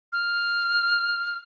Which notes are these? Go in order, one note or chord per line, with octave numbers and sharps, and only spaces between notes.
F6